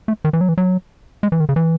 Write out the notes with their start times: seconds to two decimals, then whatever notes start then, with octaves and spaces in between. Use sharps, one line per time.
0.08 A3
0.24 D#3
0.33 E3
0.41 F#3
0.49 E3
0.58 F#3
1.23 G#3
1.32 E3
1.40 D#3
1.49 C#3
1.56 E3